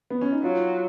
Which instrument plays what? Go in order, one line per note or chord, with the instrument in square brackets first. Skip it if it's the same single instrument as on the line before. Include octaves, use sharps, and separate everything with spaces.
[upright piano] B3
C#4
D#4
[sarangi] F#3 [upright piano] F4